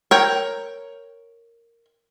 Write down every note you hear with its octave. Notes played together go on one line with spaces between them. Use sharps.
A#4 C#5 G5